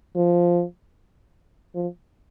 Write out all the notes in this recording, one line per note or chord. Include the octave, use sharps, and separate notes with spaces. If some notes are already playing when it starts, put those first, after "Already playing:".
F3
F3